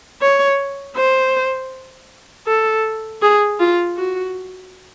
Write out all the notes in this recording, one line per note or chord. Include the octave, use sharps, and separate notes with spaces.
C#5
C5
A4
G#4
F4
F#4